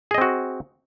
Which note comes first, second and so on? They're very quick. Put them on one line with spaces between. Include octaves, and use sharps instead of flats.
G#4 D#5 C4 F#4